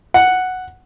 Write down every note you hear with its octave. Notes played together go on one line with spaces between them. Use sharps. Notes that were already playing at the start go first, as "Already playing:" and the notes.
F#5